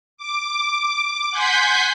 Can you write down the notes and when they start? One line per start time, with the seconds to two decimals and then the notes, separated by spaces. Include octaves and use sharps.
0.17 D6
1.31 F#5 G#5 C6 G6 B6